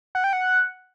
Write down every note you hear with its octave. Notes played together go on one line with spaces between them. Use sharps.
F#5
G5
F#5